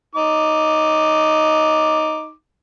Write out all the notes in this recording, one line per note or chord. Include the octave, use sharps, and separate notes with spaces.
D#4 D6